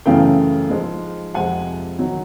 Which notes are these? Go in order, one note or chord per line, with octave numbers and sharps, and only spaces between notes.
F#2 C#3 E3 A3 F5 G5
G#2 F3 G#3
F2 C3 F3 G#3 F#5 G#5
D#3 F#3